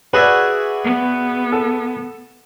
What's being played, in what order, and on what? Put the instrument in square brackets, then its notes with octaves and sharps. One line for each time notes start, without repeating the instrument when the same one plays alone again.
[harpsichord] F#4 G#4 E5 [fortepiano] B4 D5
[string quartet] B3
[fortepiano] A4